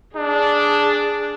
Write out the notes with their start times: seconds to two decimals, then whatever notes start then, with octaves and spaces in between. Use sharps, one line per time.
0.16 D4 G#4